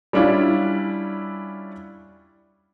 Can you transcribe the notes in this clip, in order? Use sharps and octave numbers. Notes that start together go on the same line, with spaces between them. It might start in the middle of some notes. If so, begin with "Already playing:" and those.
G3 C#4 D4 E4 F4